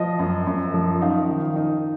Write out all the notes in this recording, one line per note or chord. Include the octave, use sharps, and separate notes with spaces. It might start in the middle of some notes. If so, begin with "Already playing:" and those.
Already playing: F3 D#5
F#2
F#2
F3
D#4 F5
D#3
D#4